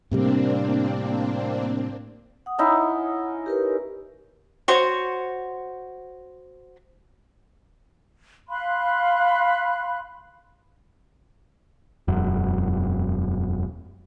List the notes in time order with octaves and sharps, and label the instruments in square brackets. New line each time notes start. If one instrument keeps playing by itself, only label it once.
[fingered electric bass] A2 C3 G3 [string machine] A#3 C4 D4
[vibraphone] F#5 D#6
[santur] C#4 D#4 E4
[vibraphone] G4 A#4 B4
[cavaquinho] F#4 C5 C#5 C#6
[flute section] F5 B5 C6 F#6
[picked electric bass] E1 F#2